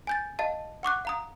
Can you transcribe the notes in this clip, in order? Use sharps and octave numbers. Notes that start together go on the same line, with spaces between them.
G#5 G6 A6
D#5 F5 A5
F#5 C#6 D6 F#6
F5 A#5 D#6